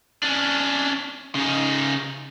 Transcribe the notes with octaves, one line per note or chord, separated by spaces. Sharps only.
C#4 D4
C#3 D#4